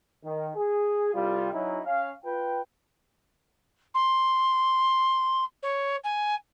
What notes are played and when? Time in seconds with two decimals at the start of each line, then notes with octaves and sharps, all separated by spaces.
0.25 D#3
0.56 G#4
1.14 C2 G3 F4
1.53 F#3 C#4 D#4 E4
1.85 C#4 F5
2.24 F4 B4 G5
3.94 C6
5.62 C#5
6.04 G#5